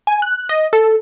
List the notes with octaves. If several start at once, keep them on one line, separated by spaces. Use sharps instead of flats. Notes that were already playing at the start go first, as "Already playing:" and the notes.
G#5
F#6
D#5
A4